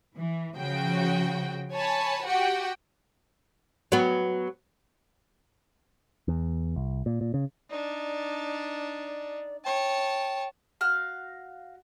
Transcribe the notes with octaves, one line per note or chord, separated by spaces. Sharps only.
E3
C#3 F3 F#4 G5
C#5 G#5 A5 B5
F#4 G4 F#5 G5
F#3 B3
E2
C2
A#2
A#2
C#3
D4 D#4 D5
C#5 G5 A5
F#4 F5 F6